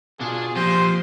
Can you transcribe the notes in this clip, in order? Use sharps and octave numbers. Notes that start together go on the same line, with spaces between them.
B2 D4 F4 G#4
A#2 F3 C4 G4 C5